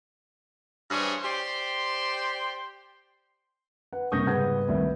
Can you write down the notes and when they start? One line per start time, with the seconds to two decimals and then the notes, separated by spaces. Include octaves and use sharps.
0.90 G2 E3 G3 G#4 C5 C#5
1.23 G4 C5 D5 G5 C6
3.93 B4 F#5
4.12 C3 G3 A#3 C#6 D#6 G6 A#6
4.27 G#2 C#3 G3 G#3 B3 F#5 G6 G#6
4.68 C2 D#3 G3 A3 B3 E4